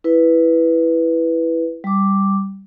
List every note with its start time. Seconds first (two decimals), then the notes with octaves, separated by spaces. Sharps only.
0.04 E4 B4
1.84 G3 D6